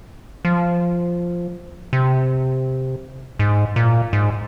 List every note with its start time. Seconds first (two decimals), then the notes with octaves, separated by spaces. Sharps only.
0.45 F3
1.93 C3
3.39 G#2
3.76 A#2
4.13 G#2